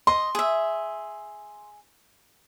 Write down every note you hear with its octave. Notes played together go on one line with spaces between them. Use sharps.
D#5 C6
G#4 E5